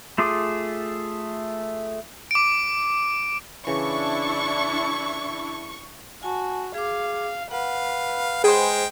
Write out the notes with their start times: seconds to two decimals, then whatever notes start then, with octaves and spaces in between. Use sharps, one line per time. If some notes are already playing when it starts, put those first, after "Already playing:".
0.18 A3 F4 G#4 D6
2.31 D6 D7
3.67 C#3 E3 D4 E4 C#6
6.23 F#4 G#5 A5
6.74 G#4 F5 D6
7.51 B4 F5 F#5
8.44 G#3 G#4 C5 G5